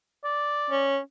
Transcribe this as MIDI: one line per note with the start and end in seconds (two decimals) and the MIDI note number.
0.24 0.90 74
0.71 0.99 61